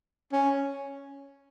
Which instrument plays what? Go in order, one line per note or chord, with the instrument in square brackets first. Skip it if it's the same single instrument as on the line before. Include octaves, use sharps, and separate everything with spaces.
[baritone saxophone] C#4